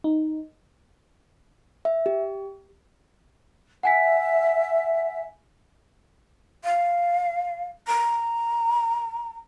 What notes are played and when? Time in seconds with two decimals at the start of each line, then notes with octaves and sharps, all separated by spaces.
0.04 D#4
1.85 E5
2.06 G4
3.83 E5 F#5 G#5 B6
6.64 F5
7.87 A#5